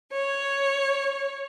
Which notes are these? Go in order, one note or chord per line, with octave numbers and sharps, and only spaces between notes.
C#5